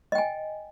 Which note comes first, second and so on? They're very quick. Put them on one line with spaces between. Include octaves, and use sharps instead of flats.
D#5 G5 G#5